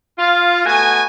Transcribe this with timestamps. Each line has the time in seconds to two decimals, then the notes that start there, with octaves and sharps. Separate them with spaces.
0.18 F4
0.65 A3 B3 F#4 G#5